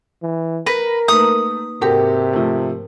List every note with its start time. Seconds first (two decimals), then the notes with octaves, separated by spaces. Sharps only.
0.22 E3
0.67 A#4 B4 A#6 B6
1.08 A3 A#3 D#4 B4 D#6
1.81 G#2 C3 F#4 G4 A4 A#4 G6
2.33 F3 A3